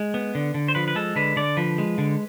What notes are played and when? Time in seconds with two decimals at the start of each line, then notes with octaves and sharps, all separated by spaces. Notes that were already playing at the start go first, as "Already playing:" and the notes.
Already playing: G#3
0.14 B3
0.35 D3
0.54 D3
0.68 C5
0.75 F3 B4
0.88 B4
0.95 G#3 A4
1.16 D3 B4
1.36 D3 D5
1.57 F3 B4
1.78 G#3
1.98 D3